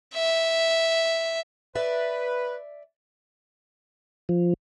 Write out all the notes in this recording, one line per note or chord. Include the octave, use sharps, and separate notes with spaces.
E5
B4 D5 E5
F3